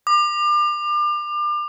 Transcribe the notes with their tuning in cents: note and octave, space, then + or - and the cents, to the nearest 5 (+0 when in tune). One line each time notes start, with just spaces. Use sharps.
D6 +35